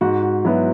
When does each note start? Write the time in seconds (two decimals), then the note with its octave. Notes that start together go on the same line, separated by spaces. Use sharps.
0.01 G#2 F#4
0.23 F#4
0.45 F#3 B3 E4